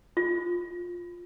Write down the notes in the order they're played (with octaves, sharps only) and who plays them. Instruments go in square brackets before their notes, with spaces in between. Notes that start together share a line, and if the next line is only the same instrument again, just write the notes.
[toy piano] F4